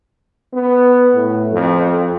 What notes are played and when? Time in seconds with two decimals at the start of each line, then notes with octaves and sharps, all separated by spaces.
0.53 B3
1.15 A2
1.52 F2